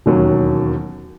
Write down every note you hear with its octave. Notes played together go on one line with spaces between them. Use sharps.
E1 D#2 D#3 F#3 C#4